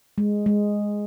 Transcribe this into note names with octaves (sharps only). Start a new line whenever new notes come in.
G#3
G#3